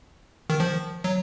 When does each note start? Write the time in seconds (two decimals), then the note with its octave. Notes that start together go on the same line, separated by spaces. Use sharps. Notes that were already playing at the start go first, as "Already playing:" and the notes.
0.50 D#3
0.60 F3
1.04 F#3